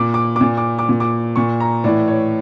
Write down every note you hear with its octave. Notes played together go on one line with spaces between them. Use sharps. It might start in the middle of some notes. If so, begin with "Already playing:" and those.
Already playing: A#2 D6
D6
A#2 D6
D6
D6
A#2
D6
A#2 C#6
A#5
A2 E3 D5
C#5